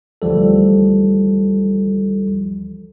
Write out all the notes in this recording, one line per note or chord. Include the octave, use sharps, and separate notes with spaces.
D2 E3 F3 G3 A4